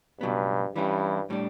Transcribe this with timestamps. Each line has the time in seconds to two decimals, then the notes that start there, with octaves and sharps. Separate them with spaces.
0.21 C#2 G2 B2 F#3 B3
0.75 G2 E3 G3 C#4 E4
1.30 A2 G3 D4